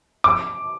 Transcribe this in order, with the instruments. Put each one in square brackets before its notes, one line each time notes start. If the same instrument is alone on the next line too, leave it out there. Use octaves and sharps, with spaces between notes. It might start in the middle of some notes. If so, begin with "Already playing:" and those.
[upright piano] D6